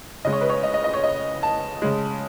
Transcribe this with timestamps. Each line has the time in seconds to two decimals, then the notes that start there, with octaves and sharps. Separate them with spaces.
0.25 C#3 G#3 D#5
0.33 C#5
0.41 B4
0.50 C#5
0.63 D#5
0.74 D#5
0.84 D#5
0.94 C#5
1.03 D#5
1.43 A5
1.82 C#3 G#3